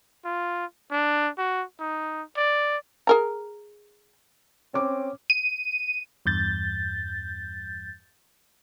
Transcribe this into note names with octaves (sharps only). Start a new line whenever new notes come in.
F4
D4
F#4
D#4
D5
G#4 A#4 A#5
C4 C#4 D6
D#7
E2 G2 G6 A6